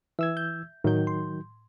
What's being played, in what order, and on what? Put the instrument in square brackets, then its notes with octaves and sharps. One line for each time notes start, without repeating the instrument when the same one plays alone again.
[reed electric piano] E3 E6 G#6 [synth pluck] E5
[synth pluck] G6
[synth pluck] A2 [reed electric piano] D#3 F#3 G6
[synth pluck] C6